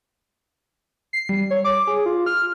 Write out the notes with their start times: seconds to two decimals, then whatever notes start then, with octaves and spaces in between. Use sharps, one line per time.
1.13 C7
1.29 G3
1.51 C#5
1.65 D6
1.87 G#4
2.06 F4
2.26 F6